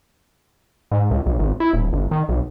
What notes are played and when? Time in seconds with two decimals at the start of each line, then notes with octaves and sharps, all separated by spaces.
0.91 G#2
1.11 C#2
1.26 B1
1.39 G#1
1.60 E4
1.73 D#1
1.93 G1
2.11 D#3
2.29 B1